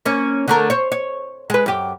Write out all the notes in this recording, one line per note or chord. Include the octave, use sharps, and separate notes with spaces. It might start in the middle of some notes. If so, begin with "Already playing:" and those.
A#3 C#4
D3 A3 A#4
C5 C#5
C#5
G#3 B4
F#2 G4